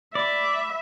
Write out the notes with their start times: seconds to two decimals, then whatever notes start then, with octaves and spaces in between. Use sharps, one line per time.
0.15 D5 E5 B5